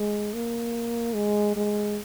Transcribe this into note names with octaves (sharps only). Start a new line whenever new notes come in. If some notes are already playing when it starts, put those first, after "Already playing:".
Already playing: G#3
A#3
G#3
G#3